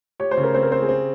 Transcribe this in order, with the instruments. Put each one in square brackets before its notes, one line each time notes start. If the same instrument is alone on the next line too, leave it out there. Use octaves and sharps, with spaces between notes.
[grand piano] G4 [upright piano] C#5
[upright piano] C5
[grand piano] C#3
[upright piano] A#4
[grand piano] C4 [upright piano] C5
[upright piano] A#4
[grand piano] C4 [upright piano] C5
[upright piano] G#4
[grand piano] C4